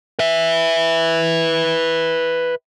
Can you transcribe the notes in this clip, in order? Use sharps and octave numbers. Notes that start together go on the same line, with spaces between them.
B4 E5